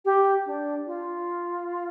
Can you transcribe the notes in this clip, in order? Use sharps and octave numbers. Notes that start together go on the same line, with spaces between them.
G4
D4
F4